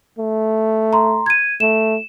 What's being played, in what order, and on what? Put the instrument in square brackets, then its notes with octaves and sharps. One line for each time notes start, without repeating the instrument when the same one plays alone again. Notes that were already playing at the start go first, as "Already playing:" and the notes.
[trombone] A3
[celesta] A#5 C6
G#6 D#7
[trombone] A3 [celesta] E7